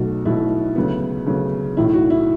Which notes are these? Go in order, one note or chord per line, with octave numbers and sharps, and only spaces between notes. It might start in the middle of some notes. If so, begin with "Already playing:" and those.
Already playing: B1 B2 F#3 A3 F#4
B1 B2 F#3 A3 E4
D2 C#3 F#3 B3
D2 C#3 F#3 B3
B1 A2 E3 E4
F#4
E4